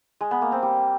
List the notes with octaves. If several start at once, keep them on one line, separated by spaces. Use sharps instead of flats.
G#3
B3
A#3
C4
G3